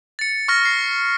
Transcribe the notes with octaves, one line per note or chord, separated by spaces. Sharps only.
A6 C#7
C#6 F6 A#6
C7